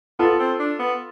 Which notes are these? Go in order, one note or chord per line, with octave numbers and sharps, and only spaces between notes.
B3 F4 A4
C4
D4
B3